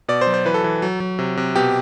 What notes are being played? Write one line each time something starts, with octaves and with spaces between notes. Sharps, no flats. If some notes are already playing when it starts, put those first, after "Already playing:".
B2 D5
C5
F#3
C5
E3 B4
A4
E3
F#3
F#3
C3
C3
B2 G4